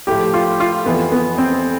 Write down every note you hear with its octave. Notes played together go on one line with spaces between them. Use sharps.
A2 F3 G4
F4
F4
F2 E3 B3
B3
C4